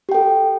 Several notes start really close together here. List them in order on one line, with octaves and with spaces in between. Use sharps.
G4 G5 A4